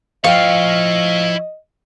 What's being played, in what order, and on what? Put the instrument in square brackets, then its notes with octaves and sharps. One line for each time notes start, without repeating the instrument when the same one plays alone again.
[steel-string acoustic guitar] F3 G5 [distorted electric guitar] E4 C#5 [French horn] D#5 [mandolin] F5